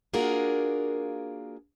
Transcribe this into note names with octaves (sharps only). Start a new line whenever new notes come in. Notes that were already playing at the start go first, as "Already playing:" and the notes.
A#3 D4 F4 F#4 G#4 A#4